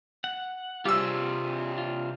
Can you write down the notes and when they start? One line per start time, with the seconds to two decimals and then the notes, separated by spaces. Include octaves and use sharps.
0.24 F#5
0.85 C3 G3 D4 F4 G4 G#4 C5 E6
1.78 F4